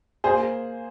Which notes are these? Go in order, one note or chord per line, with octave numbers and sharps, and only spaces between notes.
A#3 G#4 C5